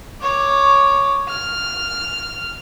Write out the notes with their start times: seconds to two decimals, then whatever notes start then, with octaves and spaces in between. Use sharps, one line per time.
0.22 C#5 D6
1.29 F6